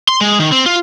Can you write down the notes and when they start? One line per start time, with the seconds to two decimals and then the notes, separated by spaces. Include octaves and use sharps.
0.09 C6
0.21 G#3
0.39 D#3
0.52 C4
0.66 F4